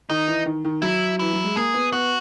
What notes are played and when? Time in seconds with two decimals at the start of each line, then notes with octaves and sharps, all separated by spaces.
0.10 D#3 D#4
0.28 E3
0.46 D#3
0.65 D#3
0.82 F#3 E4
1.19 E3 E4
1.33 F#3
1.44 G#3
1.56 A#3 G#4
1.74 B3
1.92 B3 F#4